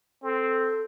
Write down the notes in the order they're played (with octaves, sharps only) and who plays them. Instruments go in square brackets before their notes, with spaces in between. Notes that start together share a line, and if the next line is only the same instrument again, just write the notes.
[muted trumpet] C4 [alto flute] A4